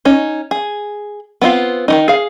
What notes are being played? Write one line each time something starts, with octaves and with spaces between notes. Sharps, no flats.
C#4 D#4
G#4
B3 C4 E4 F4
D#3 F#3 D#4
G#4 F5